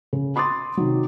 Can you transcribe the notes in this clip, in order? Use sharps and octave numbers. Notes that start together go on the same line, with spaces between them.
C#3
B5 C6 D6 D#6 A6
C3 D#3 F#3